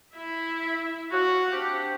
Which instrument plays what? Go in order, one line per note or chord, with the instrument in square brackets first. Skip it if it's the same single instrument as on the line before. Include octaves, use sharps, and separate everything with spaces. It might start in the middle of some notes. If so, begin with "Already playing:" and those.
[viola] E4 E5
[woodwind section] F#4 [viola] F5 F#5
[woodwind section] C4 D4 G4